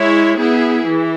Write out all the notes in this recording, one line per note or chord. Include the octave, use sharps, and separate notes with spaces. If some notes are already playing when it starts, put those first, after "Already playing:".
Already playing: G#3 E4 C#5
B3 E4 G#4
E3